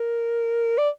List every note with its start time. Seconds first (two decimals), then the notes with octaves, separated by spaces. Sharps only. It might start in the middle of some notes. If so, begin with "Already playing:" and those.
Already playing: A#4
0.78 D5